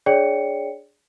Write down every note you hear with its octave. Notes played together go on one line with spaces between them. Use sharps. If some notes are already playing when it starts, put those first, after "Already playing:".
D4 G#4 C#5 D5 G5 C#7